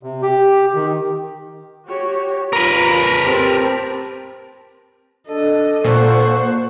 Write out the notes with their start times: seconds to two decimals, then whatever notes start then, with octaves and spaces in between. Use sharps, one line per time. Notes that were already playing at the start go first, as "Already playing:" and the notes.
0.03 C3
0.22 G4
0.75 D#3
1.86 F#4 G4 C#5
2.53 F4 A#4 B4
3.24 C4 G4 A5
5.28 D4 A4 D#5
5.84 A#2 C5 F#5 C#6